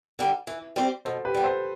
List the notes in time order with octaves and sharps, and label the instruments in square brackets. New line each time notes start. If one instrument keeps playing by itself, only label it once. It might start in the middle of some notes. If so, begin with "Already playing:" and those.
[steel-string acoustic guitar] D3 G3 D4
E3
G3 C4 G4 C5
[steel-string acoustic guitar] B2 [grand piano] A4 C5
[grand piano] G4 B4
[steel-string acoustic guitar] G3 B3
[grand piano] A4 C5